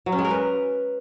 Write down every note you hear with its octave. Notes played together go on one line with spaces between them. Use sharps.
F#3
C#4
G#3
A#4
B4